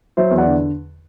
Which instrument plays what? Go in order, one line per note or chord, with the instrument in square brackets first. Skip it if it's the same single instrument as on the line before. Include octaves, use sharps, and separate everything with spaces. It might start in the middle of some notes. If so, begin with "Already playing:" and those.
[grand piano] F#3 C5 E5
E2
D5 F#5
D3